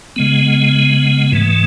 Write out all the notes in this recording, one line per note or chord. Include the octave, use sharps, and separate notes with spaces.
C#3 G#3 B3
G#2 E3 A3